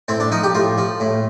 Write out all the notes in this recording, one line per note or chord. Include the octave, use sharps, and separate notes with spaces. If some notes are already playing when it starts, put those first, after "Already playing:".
A2 C4
D4
F3 D#4
G4
A2 F4
F3
A2